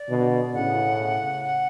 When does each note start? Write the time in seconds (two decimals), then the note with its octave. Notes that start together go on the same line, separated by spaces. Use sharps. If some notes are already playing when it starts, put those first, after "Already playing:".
Already playing: D5
0.09 B2 D3
0.54 A2 C#3 F#5
1.44 F#5